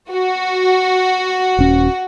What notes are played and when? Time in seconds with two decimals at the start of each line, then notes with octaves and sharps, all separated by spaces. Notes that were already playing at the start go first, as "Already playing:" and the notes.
0.12 F#4
1.59 D#1 C#4